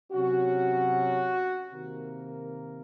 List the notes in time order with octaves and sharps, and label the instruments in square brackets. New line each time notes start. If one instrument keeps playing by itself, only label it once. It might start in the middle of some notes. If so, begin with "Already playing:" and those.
[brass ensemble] C3 F#3 C#4 F#4
C3 D#3 A#3 A#4